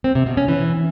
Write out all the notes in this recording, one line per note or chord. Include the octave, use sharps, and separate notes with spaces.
C4
C3
B2
C#4
E3